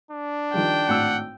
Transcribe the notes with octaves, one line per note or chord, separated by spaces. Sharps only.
D4
D#3 F3 G3 G5
G#1 A2 F#5 E6